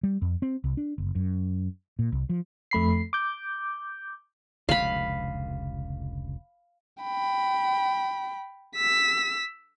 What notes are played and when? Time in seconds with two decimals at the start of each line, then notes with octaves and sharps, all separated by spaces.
0.03 G3
0.22 F2
0.42 C4
0.64 C2
0.77 D4
0.98 F#1
1.15 F#2
1.99 A#2
2.12 C2
2.29 F3
2.71 F2 A3 B5 C7
3.13 D6 G6
4.69 F1 C#2 D3 F5 B5
7.03 G5 B5
8.76 E6 B6